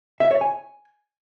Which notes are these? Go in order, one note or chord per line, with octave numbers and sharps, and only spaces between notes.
E5
C#5
G#5